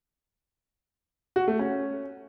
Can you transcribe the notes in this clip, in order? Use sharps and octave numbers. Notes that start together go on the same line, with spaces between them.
F#4
A3
C#4